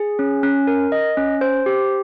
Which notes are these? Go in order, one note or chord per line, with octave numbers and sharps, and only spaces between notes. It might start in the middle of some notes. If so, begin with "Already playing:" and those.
Already playing: G#4
C#4
C#4
A#4
D#5
C#4
C5
G4